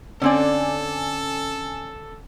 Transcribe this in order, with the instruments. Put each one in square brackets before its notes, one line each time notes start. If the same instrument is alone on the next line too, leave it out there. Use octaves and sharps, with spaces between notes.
[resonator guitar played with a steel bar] D3 C4 D5 [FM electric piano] C#4 G#5 [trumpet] A4